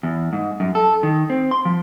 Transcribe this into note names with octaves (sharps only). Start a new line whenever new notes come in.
E2
G#2
F#2
A4
D#3
C4
C6
F3